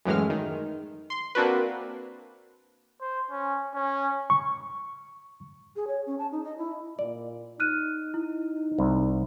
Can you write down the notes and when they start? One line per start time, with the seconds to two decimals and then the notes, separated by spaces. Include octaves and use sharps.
0.05 F#2 A2 E3 G#3 F6
0.30 D#3
1.10 C6
1.35 A#3 C4 D4 F#4 B4
3.01 C5
3.31 C#4
3.74 C#4
4.30 C#6
5.76 G#4
5.87 C#5
6.06 C#4
6.18 A5
6.32 D#4
6.44 D#5
6.58 E4
6.99 A#2 D5
7.60 D#4 F6 F#6 D#7
8.14 E4
8.78 C2